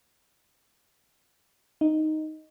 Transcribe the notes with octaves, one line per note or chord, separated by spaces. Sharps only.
D#4